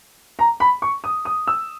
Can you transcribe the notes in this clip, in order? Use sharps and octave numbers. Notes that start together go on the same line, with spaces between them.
A#5
B5
C#6
D#6
D#6
E6